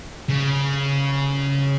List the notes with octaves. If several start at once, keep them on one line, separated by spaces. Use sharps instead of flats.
C#3